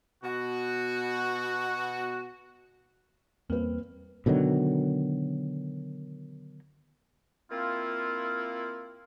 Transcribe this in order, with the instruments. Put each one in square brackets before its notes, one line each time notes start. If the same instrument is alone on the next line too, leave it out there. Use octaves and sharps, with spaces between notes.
[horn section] B2 F#4
[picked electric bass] E2 G3 [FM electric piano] A#3 [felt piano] C4 B4
[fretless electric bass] B2 D3 D#3 F#3
[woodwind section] A#3 C4 E4 F4